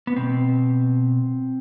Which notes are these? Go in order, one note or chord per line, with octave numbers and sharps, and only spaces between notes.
B3
B2 C4